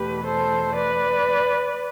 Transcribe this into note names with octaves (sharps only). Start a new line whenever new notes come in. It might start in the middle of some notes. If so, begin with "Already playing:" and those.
Already playing: E2 B2 A3 G4 B4
A4 C5
B4 D5